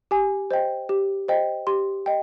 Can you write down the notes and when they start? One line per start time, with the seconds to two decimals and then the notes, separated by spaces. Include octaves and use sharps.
0.11 G4 G#5
0.51 C5 D#5 G5
0.89 G4
1.28 C5 D#5 G5
1.67 G4 C6
2.06 D#5 G5